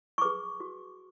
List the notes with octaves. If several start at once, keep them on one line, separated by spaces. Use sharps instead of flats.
C#6
G#4 B4 D6
F#4